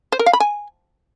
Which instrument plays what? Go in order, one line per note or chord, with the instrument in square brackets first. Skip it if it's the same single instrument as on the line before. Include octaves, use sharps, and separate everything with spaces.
[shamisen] C5
A#4
F5
B5
G#5